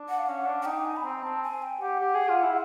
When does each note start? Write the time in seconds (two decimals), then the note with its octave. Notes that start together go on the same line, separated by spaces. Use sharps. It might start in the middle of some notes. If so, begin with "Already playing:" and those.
Already playing: D4
0.09 F#5
0.18 F5
0.28 C#4 F#5
0.46 D4
0.62 F#5
0.65 D#4 G5
0.85 G#5
0.96 B5
1.04 C4 A#5
1.23 C4 A5
1.43 G#5
1.62 G5
1.81 G4 F#5
2.00 G4
2.14 G#4
2.29 F4
2.43 E4